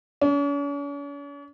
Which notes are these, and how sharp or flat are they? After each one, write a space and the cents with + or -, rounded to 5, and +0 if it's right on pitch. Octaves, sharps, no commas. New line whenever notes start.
C#4 +45